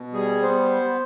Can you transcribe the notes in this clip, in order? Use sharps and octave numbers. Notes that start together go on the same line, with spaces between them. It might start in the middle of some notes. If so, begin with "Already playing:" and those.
Already playing: B2
G3 G#4
B3 C5